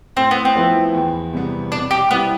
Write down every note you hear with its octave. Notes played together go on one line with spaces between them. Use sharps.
A2 C4
B3
C4
F3 B3 E4 B4
E2
C3 G3 B3
B2 D4
G4
G3 B3 C4 E4